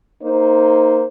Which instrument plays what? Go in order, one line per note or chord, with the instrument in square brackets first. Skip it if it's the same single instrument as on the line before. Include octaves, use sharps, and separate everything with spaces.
[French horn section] A#3 D#4 C5